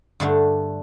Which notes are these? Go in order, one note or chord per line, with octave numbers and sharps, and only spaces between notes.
G2 D3 A3 D4